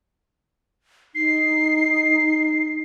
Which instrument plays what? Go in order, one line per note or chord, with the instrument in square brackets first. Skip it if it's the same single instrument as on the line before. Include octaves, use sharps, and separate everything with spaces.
[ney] D#4 [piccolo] C7